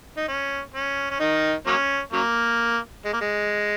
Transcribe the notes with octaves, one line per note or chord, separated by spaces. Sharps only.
D#4
C#4
C#4
C#4
D#3 D#4
F#3 A#3 C#4
C#3 F#3 A#3
G#3
A#3
G#3